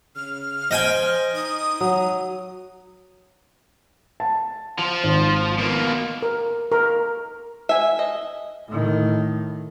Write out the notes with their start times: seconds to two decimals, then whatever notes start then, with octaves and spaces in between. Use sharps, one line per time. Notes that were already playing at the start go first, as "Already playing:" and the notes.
0.16 C#3 F6
0.71 C5 D#5 G5 G#5
1.35 D#4 D#6
1.81 F#3 C#5
4.20 A5
4.79 F3
5.04 G#1
5.58 B2 A#3
6.22 A#4
6.72 A#4
7.69 E5 G#5
7.99 D#5
8.68 A2 D#3